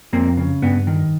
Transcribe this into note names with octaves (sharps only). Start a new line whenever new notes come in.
F2 A#3 C4
C#3
G2 B3
D#3